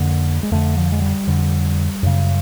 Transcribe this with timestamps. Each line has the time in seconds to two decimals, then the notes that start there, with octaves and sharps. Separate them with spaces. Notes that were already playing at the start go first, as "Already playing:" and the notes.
Already playing: F2 D3 A#3
0.43 G#3
0.51 F2 D3 A3
0.77 F3
0.92 G#3
1.02 G3
1.27 F2 D3
2.03 F#2 C#3